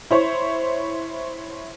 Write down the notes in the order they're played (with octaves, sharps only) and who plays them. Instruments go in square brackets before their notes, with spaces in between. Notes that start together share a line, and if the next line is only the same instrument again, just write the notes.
[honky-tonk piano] E4 C5 C#5